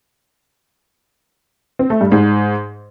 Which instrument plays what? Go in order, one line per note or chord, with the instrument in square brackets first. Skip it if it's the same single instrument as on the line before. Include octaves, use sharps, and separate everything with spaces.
[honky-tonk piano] C4
A3
G2
G#2